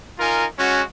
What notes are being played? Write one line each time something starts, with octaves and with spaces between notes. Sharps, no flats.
D#4 F4 A#4 G#5
G#3 C#4 F#4